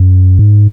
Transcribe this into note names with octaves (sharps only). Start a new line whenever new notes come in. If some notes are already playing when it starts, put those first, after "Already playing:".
Already playing: F#2
G#2